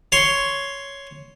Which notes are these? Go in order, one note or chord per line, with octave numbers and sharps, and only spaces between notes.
C#5 C6 C#6